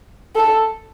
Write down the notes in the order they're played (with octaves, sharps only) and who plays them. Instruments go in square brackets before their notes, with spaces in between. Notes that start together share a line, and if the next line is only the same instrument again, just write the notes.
[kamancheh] A4